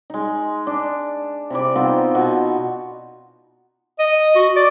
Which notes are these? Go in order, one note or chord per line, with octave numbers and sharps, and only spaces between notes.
G#3 D#4
D4
C3 E4 D5
B3 C4 D#4 F4
B2
D#5
F#4
D5